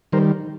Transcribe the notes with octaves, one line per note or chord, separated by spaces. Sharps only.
D#3 G3 A#4 C5